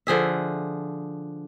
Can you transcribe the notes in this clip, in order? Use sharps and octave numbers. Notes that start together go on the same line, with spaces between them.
D3 F3 G#4 E5